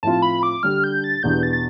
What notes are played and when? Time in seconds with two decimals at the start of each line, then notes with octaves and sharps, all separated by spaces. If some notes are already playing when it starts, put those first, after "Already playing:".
0.03 A2 F3 C4 F4 A5
0.22 B5
0.43 D6
0.63 D3 G3 D4 F6
0.84 G6
1.04 A6
1.23 E2 B2 B3 D4 G4 G6
1.43 A6
1.53 A6